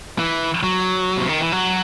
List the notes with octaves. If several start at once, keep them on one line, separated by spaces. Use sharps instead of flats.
E3
F#3
C3
D#3
E3
F#3